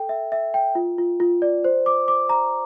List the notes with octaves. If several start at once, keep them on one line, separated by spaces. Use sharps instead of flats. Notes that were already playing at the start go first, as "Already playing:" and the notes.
Already playing: A4 G5
E5
E5
G5
F4
F4
F4
D5
C5
D6
D6
A#5